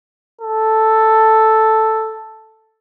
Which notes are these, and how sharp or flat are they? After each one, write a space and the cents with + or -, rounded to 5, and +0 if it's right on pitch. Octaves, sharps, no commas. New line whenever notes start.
A4 +0